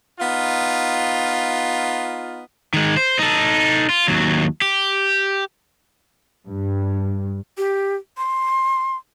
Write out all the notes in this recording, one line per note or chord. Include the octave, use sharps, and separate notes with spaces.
B3 D#4 F4
D#3 G#3
C5
D#4 A4
F4
D#2 F#3
G4
G2
G4
C6